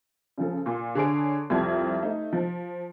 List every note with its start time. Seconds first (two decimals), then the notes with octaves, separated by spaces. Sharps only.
0.38 C#3 F3 A4
0.66 A#2
0.95 D3 G#4 C#5 D7
1.50 C2 F2 G4 G#6
2.03 A3 D#4
2.33 F3